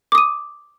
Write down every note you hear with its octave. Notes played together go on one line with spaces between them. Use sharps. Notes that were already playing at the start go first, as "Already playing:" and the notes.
D6 D#6 D#7